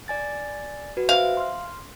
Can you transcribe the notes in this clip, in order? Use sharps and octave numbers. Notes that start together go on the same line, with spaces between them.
D5 G#5 A6
F#4 B4
C5 E5 F5
C6 F6